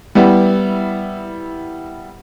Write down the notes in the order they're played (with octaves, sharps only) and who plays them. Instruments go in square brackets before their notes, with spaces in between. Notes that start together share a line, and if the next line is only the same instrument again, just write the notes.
[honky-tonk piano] G3 B3 E4